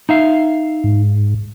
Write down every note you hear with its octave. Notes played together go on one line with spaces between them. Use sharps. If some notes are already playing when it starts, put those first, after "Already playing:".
D#4 E5 F5
G#2